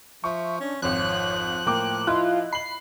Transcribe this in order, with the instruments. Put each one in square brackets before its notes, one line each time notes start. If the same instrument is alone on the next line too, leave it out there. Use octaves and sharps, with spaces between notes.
[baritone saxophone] F3 [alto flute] E5 [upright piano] C#6
[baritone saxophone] C#4 [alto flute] D4
[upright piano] G#1 F2 [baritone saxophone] F3 [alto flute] C#5 [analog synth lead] F#6
[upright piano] A2 A#3 D6 [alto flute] G5
[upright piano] E4 F#6 [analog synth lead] F4 [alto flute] D#5
[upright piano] B5 F#7 [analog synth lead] C7